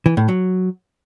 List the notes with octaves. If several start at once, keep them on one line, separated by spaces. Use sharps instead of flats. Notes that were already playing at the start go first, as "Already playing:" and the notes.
E3
A2
F#3